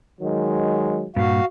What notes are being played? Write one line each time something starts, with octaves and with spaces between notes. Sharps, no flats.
D#3 F#3 G#3
G2 A#2 F#4 F5